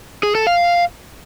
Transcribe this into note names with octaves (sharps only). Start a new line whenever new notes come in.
G#4
A4
F5